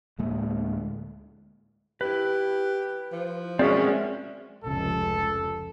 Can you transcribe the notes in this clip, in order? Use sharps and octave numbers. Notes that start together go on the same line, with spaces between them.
D2 A2 G#3 A#3
E4 G4 B4
F3
B1 G#3 C4 C#4 F#4 A#4 D5 E5
F1 C#2 F3 A4